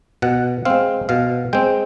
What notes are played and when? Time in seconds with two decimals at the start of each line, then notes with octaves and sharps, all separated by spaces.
0.22 B2 F#5
0.65 G#3 C4 F5
1.09 B2 F5
1.53 G#3 C4 G5